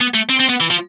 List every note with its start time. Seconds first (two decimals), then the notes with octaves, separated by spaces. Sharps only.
0.01 B3
0.14 A3
0.29 C4
0.39 C4
0.49 B3
0.60 E3
0.70 F3